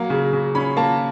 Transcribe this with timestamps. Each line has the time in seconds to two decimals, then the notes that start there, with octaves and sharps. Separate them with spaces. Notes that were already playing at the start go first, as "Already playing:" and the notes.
Already playing: F#3 A#3
0.10 C#3
0.33 C#3
0.55 C#4 B5
0.77 A#3 A5